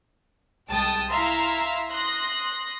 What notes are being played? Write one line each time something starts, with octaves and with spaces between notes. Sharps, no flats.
C2 G#3 G5 A5 D#6
E4 E5 F5 A#5 C6
C6 D#6 F#6 A#6